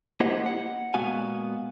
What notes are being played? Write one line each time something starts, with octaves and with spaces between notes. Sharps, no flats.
A#3 E4 G4 C5 D#5 F#5
F#5
A#2 G#3 B3 F#4 F5 G#5